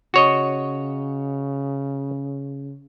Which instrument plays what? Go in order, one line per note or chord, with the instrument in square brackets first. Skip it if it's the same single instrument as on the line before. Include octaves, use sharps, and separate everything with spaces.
[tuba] C#3 [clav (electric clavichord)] F#4 C#5 D#5